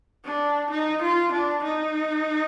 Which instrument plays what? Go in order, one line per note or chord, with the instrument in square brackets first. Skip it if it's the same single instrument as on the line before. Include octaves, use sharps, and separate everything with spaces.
[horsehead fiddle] D4
D#4
F4
D4
D#4